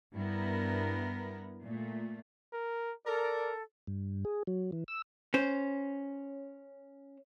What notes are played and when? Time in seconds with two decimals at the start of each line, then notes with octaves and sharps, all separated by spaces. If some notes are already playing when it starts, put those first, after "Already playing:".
0.14 G2 B3 E4 A#4
1.64 A#2 A3
2.53 A#4
3.06 A4 A#4 D5
3.87 G2
4.25 G#4
4.47 F#3
4.72 E3
4.88 E6
5.34 C#4 C5